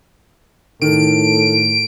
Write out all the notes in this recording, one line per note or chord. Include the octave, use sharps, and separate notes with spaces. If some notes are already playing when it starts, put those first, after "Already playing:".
A2 D#3 A4 D7